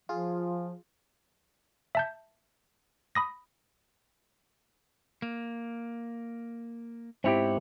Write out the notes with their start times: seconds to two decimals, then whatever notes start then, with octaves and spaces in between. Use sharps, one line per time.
0.09 F3 F4 G#4
1.95 E5 A5 G6
3.15 B5 D#6 A#6
5.22 A#3
7.24 G#2 B3 C4 E4 G4 C#5